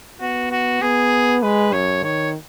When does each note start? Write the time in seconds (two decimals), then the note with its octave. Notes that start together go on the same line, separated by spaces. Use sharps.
0.21 B3 F#4
0.51 F#4
0.82 B3 G#4
1.43 G#3 B4
1.73 F#2 C#5
2.04 D#3 C#5